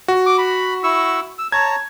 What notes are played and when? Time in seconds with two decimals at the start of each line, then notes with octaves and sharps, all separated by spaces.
0.08 F#4
0.26 D6
0.38 B5
0.84 E4 C#6 E6
1.39 E6
1.52 C#5 A5 A#5 G#6